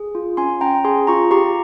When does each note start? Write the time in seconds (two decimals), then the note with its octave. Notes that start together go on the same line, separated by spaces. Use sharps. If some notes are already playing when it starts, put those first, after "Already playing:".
Already playing: G#4
0.15 F4
0.37 C#4 G#5 C6
0.61 C#4 G5 A#5
0.84 G#4 G#5 C6
1.07 F4 A#5 C#6
1.31 G4 A#5 C#6